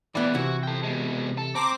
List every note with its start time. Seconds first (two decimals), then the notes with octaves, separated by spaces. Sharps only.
0.15 E3 G3 B3 E4 D5
0.35 C3 E3 F#4
0.63 A4 G5
0.84 B2 G#3
1.38 A4
1.55 C4 C5 A#5 D6